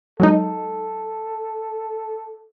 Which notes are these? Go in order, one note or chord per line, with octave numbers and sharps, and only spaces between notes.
F#3 G#3 D#4 A4